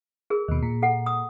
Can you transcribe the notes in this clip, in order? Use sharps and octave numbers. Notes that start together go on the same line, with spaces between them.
G#4 A#4
D#2 B2
A#2
A4 F#5
D#6